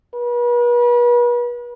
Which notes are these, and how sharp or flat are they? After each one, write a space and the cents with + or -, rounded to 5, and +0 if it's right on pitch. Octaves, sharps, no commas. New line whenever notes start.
B4 -40